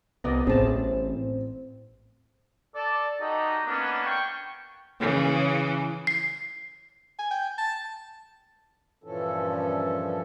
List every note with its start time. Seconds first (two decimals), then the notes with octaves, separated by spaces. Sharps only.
0.24 C2 B3 D5 D#5
0.47 A1 A2 C4 G#4 A5
2.75 A4 D5 A5
3.21 D#4 F#4 G4 A4 D#5
3.66 A#3 B3 C#4 D4
4.05 G5 C#6
5.00 C#3 E3
6.07 C7
7.19 G#5
7.31 G5
7.58 A5
9.04 G2 A#2 E3 F3 C#4 A4